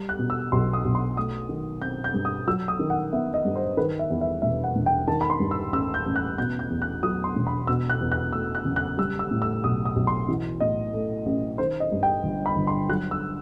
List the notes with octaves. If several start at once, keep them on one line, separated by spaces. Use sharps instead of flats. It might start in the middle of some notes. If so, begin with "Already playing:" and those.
Already playing: G3
F#6
B2
E6
B1 C6
D#6
B1
C6
A3 D#6
D#3
C4 G6
G6
G2
D#6
F#3 E6
D#6
D#3
F#5
B3 E5
D#5
G2
C5
D#3 B4
E5
E2
E5
E1 E5
F#5
E1
G5
D#3 A5
B5
C6
G2
E6
A1 E6
G6
A1
F#6
B2 G6
G6
E2
F#6
F#3 D#6
C6
E1
B5
B2 E6
F#6
E2
F#6
A3 E6
F#6
F#1
F#6
G3 E6
E6
A2
E6
B1 D#6
D#6
B1
C6
E3
A2 D#5
A3
A1
D#3 C5
D#5
G2
G5
G1
B5
G1
C6
F#3 F#6
E6